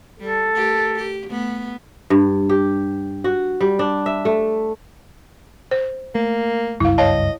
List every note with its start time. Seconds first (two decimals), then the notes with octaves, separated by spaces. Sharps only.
0.20 G3 A4
0.54 A3 G4 A#4
0.96 G4
1.29 A3 B3
2.10 G2
2.49 G4
3.24 F#4
3.61 G3
3.79 D4
4.06 E5
4.25 A3
5.71 C5
6.15 A3 A#3
6.80 F#1 C#2 G2 E4 F5
6.98 C#5 D#5 F5 A5